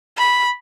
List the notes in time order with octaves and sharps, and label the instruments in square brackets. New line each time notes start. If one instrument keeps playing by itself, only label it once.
[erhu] B5